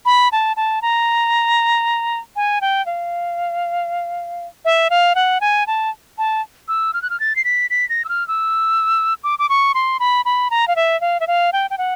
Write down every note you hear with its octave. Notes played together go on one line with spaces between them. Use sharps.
B5
A5
A5
A#5
G#5
G5
F5
E5
F5
F#5
G#5
A5
A5
E6
F6
F#6
F6
A6
C7
B6
B6
A#6
E6
F6
E6
D6
D6
C#6
C6
B5
B5
A#5
F5
E5
F5
E5
F5
G5
G5
F#5